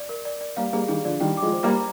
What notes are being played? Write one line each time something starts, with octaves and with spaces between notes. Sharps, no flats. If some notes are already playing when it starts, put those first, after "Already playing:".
Already playing: D5
A#4
D5
D5
G3 A#3 F5
G3 A#3 G#4
D#3 G3 G#4
D3 F3 D5
D#3 G3 G5
F3 G#3 D6
C5
G3 A#3
A#5